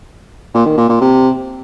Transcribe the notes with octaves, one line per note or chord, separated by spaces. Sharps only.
A#2
D#3
A#2
A#2
C3